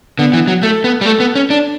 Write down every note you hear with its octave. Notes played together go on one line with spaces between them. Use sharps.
D3 B3
E3
F#3
A3 A4
B3
G3
A3 A4
B3
C#4
D4